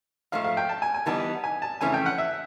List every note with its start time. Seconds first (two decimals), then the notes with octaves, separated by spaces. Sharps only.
0.32 G#2 F3 A3 F5
0.44 F5
0.57 G5
0.69 A5
0.82 G#5
0.94 G#5
1.06 E3 G3 B3 D#4 A5
1.44 G#5
1.62 A5
1.81 F2 C#3 E3 A3 C#4 G#5
1.94 G5
2.06 F#5
2.18 E5